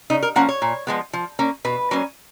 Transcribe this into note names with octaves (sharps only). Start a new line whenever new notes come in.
C#3 D#4
A#4
F3 A#3 C#4 F#5
C#5
A#2
F3 G#3 B3
F3
A#3 C#4
B2 B4
F#3 A#3 C#4